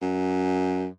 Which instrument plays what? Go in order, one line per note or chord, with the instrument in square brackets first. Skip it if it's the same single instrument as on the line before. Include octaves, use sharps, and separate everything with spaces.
[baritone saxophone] F#2